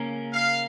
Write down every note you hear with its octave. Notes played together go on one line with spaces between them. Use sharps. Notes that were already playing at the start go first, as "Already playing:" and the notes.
Already playing: C#3 A#3 C#4 A#4
F5